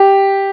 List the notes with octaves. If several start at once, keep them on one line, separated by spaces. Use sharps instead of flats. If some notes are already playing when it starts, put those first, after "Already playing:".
Already playing: G4